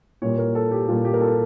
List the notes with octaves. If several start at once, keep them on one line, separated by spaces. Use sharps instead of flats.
A#2 G3 A#3 C#5
A#4
A4
G4
A#2 G3 A#3 F4
G4
A#4
A4